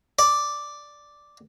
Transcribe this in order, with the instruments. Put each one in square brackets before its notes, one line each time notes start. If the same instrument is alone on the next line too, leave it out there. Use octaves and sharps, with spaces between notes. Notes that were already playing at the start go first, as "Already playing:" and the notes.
[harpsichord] D5